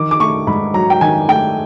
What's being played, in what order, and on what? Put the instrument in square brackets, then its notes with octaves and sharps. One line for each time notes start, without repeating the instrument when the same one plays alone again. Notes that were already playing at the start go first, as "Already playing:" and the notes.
Already playing: [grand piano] D#3 D6
D6
A3 C#6
G#2 B5
F#3 A#5
G5
D#3 G#5
A3 G5